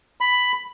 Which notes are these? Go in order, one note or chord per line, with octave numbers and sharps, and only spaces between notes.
B5